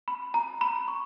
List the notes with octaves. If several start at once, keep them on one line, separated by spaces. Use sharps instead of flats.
B5
A#5
B5
C#6